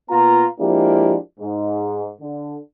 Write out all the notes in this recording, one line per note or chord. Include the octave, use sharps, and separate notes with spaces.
A#2 B3 F4 A#5
F3 G#3 A#3 D4 E4 G4
G#2
D3